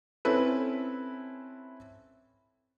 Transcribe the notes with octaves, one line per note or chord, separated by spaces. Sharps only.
C4 C#4 E4 A4 B4